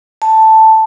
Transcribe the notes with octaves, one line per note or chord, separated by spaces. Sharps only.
A5